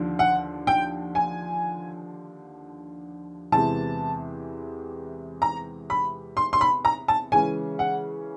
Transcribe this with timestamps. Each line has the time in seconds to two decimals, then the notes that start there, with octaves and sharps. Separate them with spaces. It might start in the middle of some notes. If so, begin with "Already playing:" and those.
Already playing: D#2 D3 F3
0.19 F#5
0.67 G5
1.15 G#5
3.52 E2 C3 E3 G#3 C4 A5
5.42 A#5
5.90 B5
6.37 C6
6.53 C6
6.61 B5
6.85 A#5
7.08 A5
7.32 C#3 E3 G#3 C#4 G#5
7.79 F#5